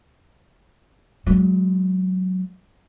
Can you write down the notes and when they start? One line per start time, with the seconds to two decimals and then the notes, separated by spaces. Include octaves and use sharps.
1.26 F#3 G#3